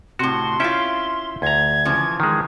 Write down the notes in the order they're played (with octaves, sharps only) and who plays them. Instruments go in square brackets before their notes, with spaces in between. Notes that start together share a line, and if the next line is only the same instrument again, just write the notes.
[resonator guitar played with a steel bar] A2 C3 [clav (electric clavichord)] F#4 [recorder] C6
[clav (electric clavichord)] C#4 E5 G5 [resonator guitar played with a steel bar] E4 F4
[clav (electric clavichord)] D2 A#5 [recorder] G#6
[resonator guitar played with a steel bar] C#3 E3 F3
[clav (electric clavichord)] D#3 G#3